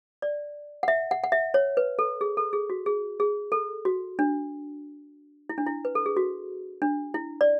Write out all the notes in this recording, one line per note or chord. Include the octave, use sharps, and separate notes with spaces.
D5
F#5
E5
F#5
F#5
E5
C#5
B4
A4
G#4
A4
G#4
F#4
G#4
G#4
A4
F#4
D4
E4
D4
E4
B4
A4
G#4
F#4
D4
E4
D5